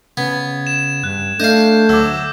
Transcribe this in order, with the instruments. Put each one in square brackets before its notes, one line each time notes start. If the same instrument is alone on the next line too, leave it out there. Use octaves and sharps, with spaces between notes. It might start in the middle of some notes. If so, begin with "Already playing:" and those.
[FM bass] C#3 [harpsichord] B3 [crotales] G#6
[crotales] E7
[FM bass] G2 [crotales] F#6
[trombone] A3 [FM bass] D4 [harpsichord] D#5 F5 [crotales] G6
[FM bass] D2 [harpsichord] F#3 [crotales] D6 E6